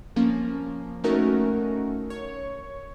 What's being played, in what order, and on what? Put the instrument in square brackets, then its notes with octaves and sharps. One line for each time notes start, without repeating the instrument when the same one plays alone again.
[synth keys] F3 A#3 C#4
A3 C#4 D#4 F#4 A#4
C#5